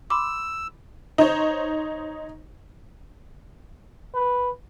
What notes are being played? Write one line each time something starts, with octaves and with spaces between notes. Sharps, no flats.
B5 C6 D6 E6
D#4 C5 C#5
B4